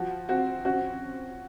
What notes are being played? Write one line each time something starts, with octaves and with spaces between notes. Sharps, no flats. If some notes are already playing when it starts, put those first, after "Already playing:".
Already playing: F3 F#4
C4 F#4
C#4 F#4